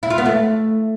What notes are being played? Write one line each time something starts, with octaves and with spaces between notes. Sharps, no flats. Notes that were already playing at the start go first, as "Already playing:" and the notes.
E4
F4
B3
A3